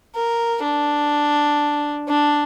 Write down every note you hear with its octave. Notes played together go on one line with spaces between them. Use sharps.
A#4
D4
D4